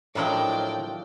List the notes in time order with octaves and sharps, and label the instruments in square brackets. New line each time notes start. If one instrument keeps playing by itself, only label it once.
[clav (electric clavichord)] A2 D#4 A#4 [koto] F3 F#3 D4 [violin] D5 G5